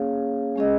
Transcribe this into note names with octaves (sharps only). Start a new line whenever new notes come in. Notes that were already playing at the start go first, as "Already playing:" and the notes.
Already playing: A#3 C#4 G#4 C#5 F5
G#3 C#4 G#4 D#5